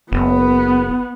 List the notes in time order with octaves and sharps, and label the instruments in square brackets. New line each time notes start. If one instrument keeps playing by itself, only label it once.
[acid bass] F#1 [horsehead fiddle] B3